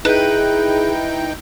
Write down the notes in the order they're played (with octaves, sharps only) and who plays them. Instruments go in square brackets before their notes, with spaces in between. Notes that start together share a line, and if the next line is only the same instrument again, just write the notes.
[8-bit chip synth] D#4 G5 [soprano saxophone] E4 [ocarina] G#4 [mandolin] B4